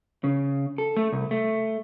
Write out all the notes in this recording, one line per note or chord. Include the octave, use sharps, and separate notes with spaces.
C#3
A4
A3
C2
A3